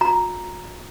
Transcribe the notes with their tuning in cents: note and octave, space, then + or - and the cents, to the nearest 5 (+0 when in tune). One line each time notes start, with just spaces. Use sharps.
F#4 -45 A#5 +0